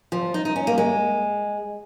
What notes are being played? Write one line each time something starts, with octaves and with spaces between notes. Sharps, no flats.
F3
D#4
D#4
C#4
A#3
G#3